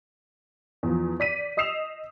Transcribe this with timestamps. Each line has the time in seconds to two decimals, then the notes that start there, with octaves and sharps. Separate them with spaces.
0.83 E2 F3
1.20 D5 B6 D#7
1.57 D#5 D#6 E6 C7 E7 F7